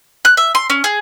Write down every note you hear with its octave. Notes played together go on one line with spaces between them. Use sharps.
F#6
E5
C6
C#4
G#4